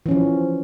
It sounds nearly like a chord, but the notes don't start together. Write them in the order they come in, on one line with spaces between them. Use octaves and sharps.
E3 C#4 F3